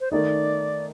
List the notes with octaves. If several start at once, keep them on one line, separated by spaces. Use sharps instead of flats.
C5
D#3 A3 D#4 D5